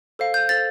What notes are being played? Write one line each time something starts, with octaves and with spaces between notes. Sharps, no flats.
A4 C5 F5
G6
A4 C5 F5 A6